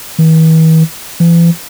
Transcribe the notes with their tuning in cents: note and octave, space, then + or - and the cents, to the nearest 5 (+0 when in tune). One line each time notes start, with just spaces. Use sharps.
E3 -45
E3 +40